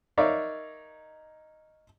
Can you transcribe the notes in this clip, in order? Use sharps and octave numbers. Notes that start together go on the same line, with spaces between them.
D#4 A#4 C#5 D5 E5 F5